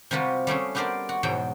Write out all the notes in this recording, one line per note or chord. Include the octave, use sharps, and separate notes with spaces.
C3 F3 G3 F4 F#4 B4
G3 A3 C#4 G#4
B3 D4 G4 A#4 C5 D5
F#4
E2 G#2 B2 F#3 G5